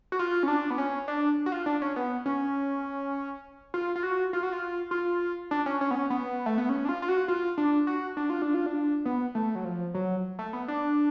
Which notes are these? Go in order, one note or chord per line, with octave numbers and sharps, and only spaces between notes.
F#4
F4
C#4
D4
B3
C#4
D4
F#4
F4
D4
C#4
B3
C#4
F4
F4
F#4
F4
F#4
F4
F4
D4
C#4
C#4
B3
C#4
B3
A3
B3
C#4
D4
F4
F4
F#4
F4
D4
F#4
D4
F4
D4
F4
D4
B3
A3
F#3
F3
F#3
A3
B3
D4